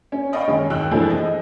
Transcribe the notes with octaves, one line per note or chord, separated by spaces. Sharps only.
C#4
D5 D#5 F5 G5 B5 C#6
F#2 D#3 G#3 C#4
G#1 D#2 G5 E6 F#6
E3 F3 G#3 A3 D4 E4
D#5